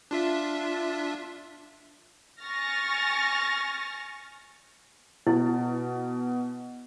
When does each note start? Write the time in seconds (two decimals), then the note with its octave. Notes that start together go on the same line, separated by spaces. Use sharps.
0.11 D4 F4 E5
2.41 G#5 C#6 F6 A6 A#6
5.27 B2 E4